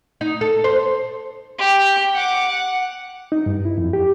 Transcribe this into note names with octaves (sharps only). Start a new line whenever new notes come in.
D#4
A4
C5
G4
F#5 D6
F#5
D#4
G2
E4
F2
G4